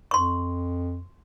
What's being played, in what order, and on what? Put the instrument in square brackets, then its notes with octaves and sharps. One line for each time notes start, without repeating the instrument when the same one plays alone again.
[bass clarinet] F2 [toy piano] C6 C#6